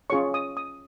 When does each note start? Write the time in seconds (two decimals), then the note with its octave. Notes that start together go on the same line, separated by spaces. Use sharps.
0.10 C#4 F4 G#4 C#5 C#6
0.34 D#6
0.57 D#6